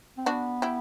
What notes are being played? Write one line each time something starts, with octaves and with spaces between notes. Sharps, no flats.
C4
B3 D4 F#4
E4 G4